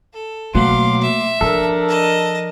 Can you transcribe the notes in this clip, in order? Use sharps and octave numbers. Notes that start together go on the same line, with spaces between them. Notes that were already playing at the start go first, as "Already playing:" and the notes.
A4
B2 F#3 A3 A#3 F5 C6 D6
E5
F3 D4 A4 A#4
D#5 A5